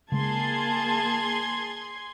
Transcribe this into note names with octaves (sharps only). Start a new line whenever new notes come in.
C#3 G#3 A#3 G#4 A5 C6 G#6